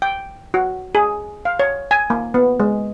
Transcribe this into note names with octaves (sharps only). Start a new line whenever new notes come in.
G5
F#4
G#4
F5
C#5
G#5
A#3
B3
G#3